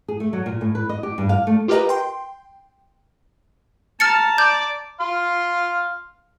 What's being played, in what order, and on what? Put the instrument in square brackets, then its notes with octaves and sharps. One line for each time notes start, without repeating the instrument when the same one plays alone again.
[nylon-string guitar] G#4
A3
F#3
A#2
A2
B4
D#5
G4
G2
F5
A3
[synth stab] F4 G4 A#4 B4 D#5 A#5
G5 C6
[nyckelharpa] A5 A#5 [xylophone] F6 A6 C#7
[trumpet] D5 [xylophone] G6
[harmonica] F5 C6